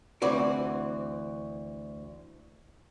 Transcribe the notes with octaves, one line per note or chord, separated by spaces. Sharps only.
D2 E3 C4 F#4 D5